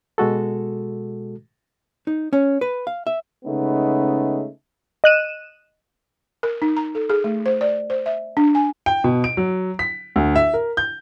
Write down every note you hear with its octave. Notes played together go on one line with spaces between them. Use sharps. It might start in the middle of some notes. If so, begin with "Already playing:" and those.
B2 G#3 F#4 A4
D#4
C#4
B4
F5
E5
C#3 G#3 A3 B3 C#4 D#4
D#5 F#6 D#7 E7
A#4
D#4
A#5
A4
G#4
A3
C5
D5
C5
E5
D4
G#5
G5
B2
D7
F#3
B6
D2
E5
A#4
G6